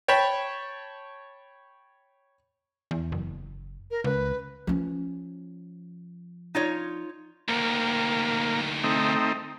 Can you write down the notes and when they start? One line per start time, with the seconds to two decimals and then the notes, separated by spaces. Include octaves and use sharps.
0.08 C#5 G5 A5 B5
2.91 E2
3.12 F#1
3.91 A#4
4.04 C#2 B4
4.67 F3 C#4
6.55 D#4 F4 C#5
7.49 D2 D#3 A#3
8.84 A3 C4 D#4